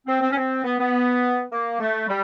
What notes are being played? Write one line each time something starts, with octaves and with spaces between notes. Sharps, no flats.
C4
C4
C#4
C4
B3
B3
A#3
A3
G3